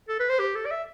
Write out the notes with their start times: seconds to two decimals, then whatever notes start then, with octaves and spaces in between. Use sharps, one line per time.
0.09 A4
0.20 B4
0.30 C5
0.40 G4
0.55 A4
0.66 D5
0.71 E5